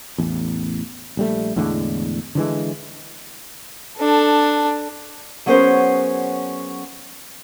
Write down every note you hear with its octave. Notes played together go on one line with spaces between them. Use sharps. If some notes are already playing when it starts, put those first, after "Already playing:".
A1 E2
A#1 G3 A3
E2 A2 D3 G#3
D3 E3 G#3
D4 A4
F#3 B3 C#4 G#4 A#4 C5